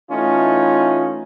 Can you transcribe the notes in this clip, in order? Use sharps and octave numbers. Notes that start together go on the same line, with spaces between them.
E3 A3 C#4 D#4 F4